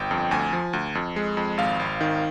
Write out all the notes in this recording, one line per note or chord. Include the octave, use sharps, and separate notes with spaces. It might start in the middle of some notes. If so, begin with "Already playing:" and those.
Already playing: G1 G5
F2
D2 G#5
F3
D2
F2
G#3
F2
G#1 F5
G#1
D#3